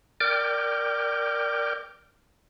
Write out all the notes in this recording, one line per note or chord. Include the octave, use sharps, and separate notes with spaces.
A#4 D5 G5 D6 F6 G6